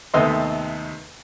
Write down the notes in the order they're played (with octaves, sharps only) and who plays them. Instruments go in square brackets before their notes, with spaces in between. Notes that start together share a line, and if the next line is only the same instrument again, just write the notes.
[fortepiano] D#2 C3 A3 B3 D#5 C6